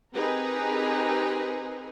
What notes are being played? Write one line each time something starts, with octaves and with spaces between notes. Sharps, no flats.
C4 D#4 G4 G#4 A#4 B4